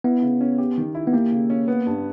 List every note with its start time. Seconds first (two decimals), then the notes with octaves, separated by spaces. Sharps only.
0.04 B3 E4
0.22 C#3
0.41 C#4
0.58 G4
0.78 D#3
0.95 E4
1.07 B3
1.13 A#3 G4
1.32 C#3
1.50 C#4
1.68 B3
1.87 G2